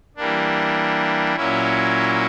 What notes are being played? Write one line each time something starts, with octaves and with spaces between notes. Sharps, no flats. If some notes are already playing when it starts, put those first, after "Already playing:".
E3 G3 A#3 D4
A#2 F#3 A#3 C#4 E4